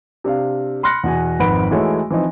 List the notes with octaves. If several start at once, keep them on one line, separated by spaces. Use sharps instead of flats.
C3 D4 F5
B5 C6 F6 F#6 A#6 C#7
E2 B2 G#5
G#1 F2 B4 F#5 B5 D7
E3 G#3 A3 E4 F#4 C#5
E3 F3 C4 D#4